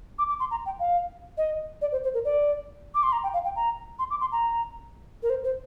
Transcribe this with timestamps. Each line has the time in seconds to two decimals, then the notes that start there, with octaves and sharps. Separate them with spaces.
0.19 D6
0.29 D6
0.40 C6
0.51 A#5
0.66 G5
0.79 F5
1.38 D#5
1.82 D5
1.92 C5
2.04 C5
2.14 A#4
2.25 D5
2.95 D6
3.03 C6
3.13 A#5
3.23 G5
3.34 F5
3.45 G5
3.56 A#5
3.99 C6
4.10 D6
4.21 C6
4.32 A#5
5.23 A#4
5.30 C5
5.44 C5